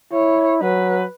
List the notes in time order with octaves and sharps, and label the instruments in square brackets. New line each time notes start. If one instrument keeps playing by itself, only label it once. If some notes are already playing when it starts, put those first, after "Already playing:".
[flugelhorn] E4 [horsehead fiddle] C#5
[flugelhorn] F#3 [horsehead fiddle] B4